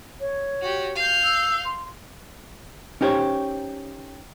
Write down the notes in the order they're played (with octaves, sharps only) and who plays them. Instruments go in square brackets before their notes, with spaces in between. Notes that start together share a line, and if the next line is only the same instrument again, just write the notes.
[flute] C#5
[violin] F#4 G4
F5 G6
[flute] E6
C6
[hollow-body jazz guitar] C#4 D#4 G4 C5 C#5